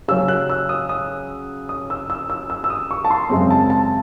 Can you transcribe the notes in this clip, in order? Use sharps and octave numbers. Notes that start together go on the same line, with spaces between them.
C#3 F#3 C#4 E6
F#6
E6
D#6
D#6
D#6
E6
E6
E6
E6
E6
D#6
C#6
A5
C6
F#2 C#3 G#3 C4
A5
A5